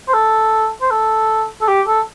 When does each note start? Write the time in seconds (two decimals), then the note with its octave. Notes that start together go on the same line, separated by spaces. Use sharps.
0.08 C5
0.14 A4
0.82 C5
0.91 A4
1.62 A4
1.68 G4
1.87 A4